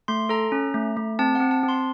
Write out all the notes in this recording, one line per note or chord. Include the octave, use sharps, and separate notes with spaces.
A3 C6
A4 A#5
C#4
A3
A3
C4 A5
F#5
C4
A5
C4
C6